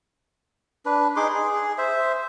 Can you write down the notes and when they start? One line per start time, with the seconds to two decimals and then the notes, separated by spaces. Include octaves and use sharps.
0.86 D4 B4
1.16 D#4 G#4 C6 D6
1.34 G#4
1.78 C5 E5